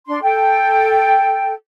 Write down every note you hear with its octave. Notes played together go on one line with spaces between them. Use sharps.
D4 C6
A4 G5